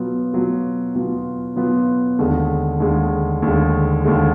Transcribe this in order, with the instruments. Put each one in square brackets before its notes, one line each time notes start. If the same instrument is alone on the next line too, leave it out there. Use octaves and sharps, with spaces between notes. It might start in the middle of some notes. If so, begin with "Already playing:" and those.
Already playing: [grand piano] B2 F#3 B3 F4
B2 F#3 B3 F4
B2 F#3 B3 F4
B2 F#3 B3 F4
D#2 D3 G#3
D#2 D3 G#3
D#2 D3 G#3
D#2 D3 G#3